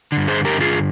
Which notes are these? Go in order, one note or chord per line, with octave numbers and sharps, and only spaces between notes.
G2 D3
G#4 C5
G4 A#4
F4 G#4